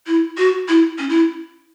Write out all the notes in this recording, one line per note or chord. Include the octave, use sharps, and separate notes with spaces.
E4
F#4
E4
C#4
E4